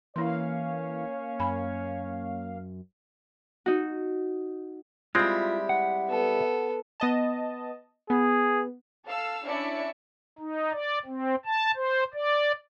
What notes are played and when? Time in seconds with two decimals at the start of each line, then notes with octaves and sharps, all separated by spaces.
0.16 E3 A#3 C#4 E4 C#5 F5 C6
1.40 F#2 G#5 B5
3.66 D#4 F#4
5.15 G3 G#3 C4 E4 F4
5.69 F#5
6.09 B3 A4
7.00 B3 D#5 A5
8.10 B3 G#4
9.06 A4 F5 E6
9.45 C#4 D4 E4 D5 E5 C#7
10.39 D#4
10.73 D5
11.06 C4
11.45 A5
11.76 C5
12.14 D5